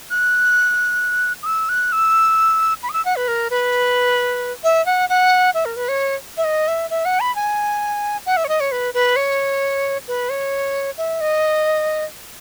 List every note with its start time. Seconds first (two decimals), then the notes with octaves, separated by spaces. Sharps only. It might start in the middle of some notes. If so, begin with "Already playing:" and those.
0.10 F#6
1.43 D#6
1.46 E6
1.69 F#6
1.92 E6
2.83 B5
2.89 D#6
2.93 E6
3.05 F#5
3.16 B4
3.28 A#4
3.50 B4
4.64 E5
4.86 F#5
5.09 F#5
5.54 E5
5.65 A#4
5.76 B4
5.88 C#5
6.37 E5
6.44 D#5
6.68 E5
6.90 E5
7.05 F#5
7.20 B5
7.36 G#5
8.26 F#5
8.37 E5
8.45 C#5
8.49 D#5
8.60 C#5
8.72 B4
8.94 B4
9.16 C#5
10.08 B4
10.29 C#5
10.98 E5
11.21 D#5